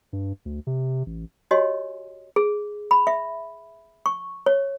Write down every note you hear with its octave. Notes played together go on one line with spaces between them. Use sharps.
G2
D2
C3
A1
F#4 G4 C#5 D#5 G#5 C6
G#4
B5
E5
C#6
C#5